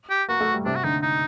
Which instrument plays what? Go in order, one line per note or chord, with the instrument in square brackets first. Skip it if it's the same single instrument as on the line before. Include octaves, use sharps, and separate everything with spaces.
[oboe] G4
[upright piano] A#3 [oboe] F#4
[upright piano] A3
G3
[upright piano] C3 [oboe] D4
[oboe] F#4
[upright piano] D3 [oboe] D#4
[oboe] D#4